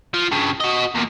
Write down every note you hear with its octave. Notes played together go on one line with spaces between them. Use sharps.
F3
G2 C#3
F#4 D#5
E2 A#2